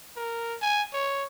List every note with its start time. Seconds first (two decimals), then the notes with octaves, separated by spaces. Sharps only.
0.16 A#4
0.62 G#5
0.93 C#5